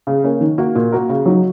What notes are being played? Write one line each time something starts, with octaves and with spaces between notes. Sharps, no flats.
C#3
A#3 C#4
D#3
A#3 F#4 A#4
A#2
A#3 F#4 A#4
C#3
F#3 D#4